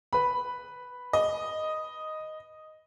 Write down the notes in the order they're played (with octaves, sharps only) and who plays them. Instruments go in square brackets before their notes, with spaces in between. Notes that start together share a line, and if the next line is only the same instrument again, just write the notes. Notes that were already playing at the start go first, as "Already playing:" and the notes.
[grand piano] B4 B5
[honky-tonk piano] D#5